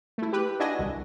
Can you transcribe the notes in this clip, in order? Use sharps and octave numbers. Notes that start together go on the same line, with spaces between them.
A3 E4
G4 B4
D4 E4 F#4 D#5 G#5 A#6
C2